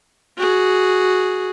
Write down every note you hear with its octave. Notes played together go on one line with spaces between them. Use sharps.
F#4 G#4